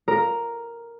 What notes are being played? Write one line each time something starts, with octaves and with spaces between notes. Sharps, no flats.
A#4